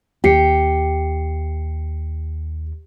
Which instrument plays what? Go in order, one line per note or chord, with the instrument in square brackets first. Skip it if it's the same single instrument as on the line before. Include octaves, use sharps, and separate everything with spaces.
[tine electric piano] D#2 C7 C#7 [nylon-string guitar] G4